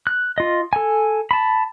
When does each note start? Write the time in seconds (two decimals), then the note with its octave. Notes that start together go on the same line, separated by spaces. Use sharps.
0.07 F#6
0.38 F4 D#5
0.73 A4 G#5
1.31 A5 B5